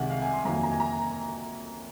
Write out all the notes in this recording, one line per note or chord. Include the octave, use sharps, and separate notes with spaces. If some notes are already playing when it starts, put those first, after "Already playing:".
Already playing: C2 C3 D#3 G#3 F#5 G#5
F5
G#5
C6
F2 D#3 F#3 A#3 A#5
G#5
A#5
G#5
A#5